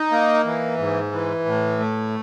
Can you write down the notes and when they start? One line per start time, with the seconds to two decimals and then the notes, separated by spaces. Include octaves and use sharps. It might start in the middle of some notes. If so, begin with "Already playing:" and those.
Already playing: D#4
0.12 A#3
0.45 E3
0.78 G#2
1.12 E3
1.45 A2
1.79 A3